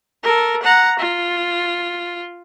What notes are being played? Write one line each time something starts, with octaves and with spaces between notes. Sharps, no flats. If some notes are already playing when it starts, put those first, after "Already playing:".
A4 A#4
F#5 A#5
F4